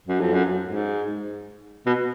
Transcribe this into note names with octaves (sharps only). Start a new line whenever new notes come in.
F#2
F2
F#2
G#2
B2